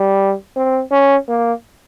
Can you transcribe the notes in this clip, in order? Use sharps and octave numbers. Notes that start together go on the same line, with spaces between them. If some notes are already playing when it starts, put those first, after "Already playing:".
Already playing: G3
C4
C#4
A#3